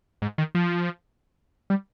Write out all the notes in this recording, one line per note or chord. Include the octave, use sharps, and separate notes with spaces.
G#2
D#3
F3
G3